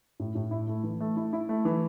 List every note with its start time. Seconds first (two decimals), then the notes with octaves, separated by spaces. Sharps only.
0.20 A2
0.35 A2
0.51 E4
0.68 A3
0.83 E3
1.00 A3
1.17 E4
1.33 E4
1.49 A3
1.65 E3